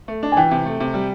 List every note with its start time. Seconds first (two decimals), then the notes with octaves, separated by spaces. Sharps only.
0.08 A3
0.23 D4
0.32 G#5
0.37 E3 G5
0.51 C3
0.66 A3
0.80 C3
0.94 G3